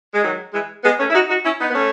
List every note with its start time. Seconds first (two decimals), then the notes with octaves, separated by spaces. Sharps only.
0.13 G#3
0.23 D#3 F#3
0.53 E3 G#3
0.84 G#3 B3
0.99 A3 C#4
1.10 E4
1.14 D#4 F#4
1.29 D#4 F#4
1.44 C#4 E4
1.59 B3 D#4
1.70 B3
1.75 A3 C#4